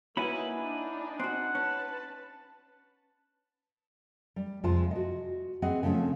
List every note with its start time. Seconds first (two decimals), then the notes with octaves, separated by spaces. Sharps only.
0.17 A#3 C#4 D#4 E4 F#4 B4 G#5 B5
0.52 D4 D#4
1.20 C4 F#4 F#5
1.55 C#4 B4 A5
4.36 G3
4.64 F2 C3 G#3 F4 C5 A5
4.91 F#4 D#5
5.62 C4 G#4 B4 D#5 F#5
5.83 C#3 F3 A3 C4 C#4